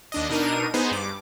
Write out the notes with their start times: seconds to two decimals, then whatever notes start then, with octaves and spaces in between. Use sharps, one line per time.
0.12 D#2 D4 D#5
0.29 B2 D4 D#4 A#4 D#7
0.74 B3 D#4 G#4 C5
0.91 G2 D6